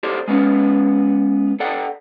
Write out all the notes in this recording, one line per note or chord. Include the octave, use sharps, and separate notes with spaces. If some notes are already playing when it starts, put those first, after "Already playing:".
G4 A4 C5 D5
G#3 B3 C#4
A4 D5 F#5 G5